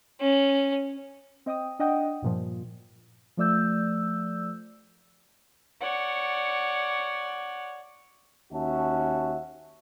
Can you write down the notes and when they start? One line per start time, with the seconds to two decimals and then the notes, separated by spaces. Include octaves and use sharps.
0.21 C#4
1.46 C4 D#5 G5 D#6
1.79 D4 D#5 F#5 G5 D#6
2.22 G2 A#2 F3
3.37 F3 A3 D5 E6 G6
5.81 C#5 D5 F#5
8.52 D#2 C#4 F#4 E5 A5